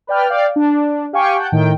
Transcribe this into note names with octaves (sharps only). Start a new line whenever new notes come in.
B4 D5 G5 F6
D5 F5 G5
D4
G4 F5 G5 G#5 C#6
F#5 G5 A5 G6
A2 D#3 G5